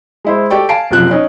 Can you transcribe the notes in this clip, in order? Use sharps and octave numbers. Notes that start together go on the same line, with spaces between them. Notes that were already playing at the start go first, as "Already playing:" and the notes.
G#3 E4 C5
G4 A4 D5 G5 C#6
F5 G#5 A5 C7 D7
F#1 C3 F3 F#6
C#4 D#4